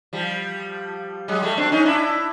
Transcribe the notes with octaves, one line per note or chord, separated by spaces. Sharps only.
F3 G3
F#3 G#3
G3 A3
C4 D4
C#4 D#4
D4 E4